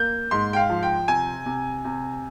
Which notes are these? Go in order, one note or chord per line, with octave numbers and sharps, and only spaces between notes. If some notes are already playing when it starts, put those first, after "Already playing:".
Already playing: A#3 G6
G#2 C6
G5
F5
F3
G5
C3 G#5
C3
C3